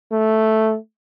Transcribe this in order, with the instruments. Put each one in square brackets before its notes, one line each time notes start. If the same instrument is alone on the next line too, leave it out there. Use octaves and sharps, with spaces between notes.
[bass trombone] A3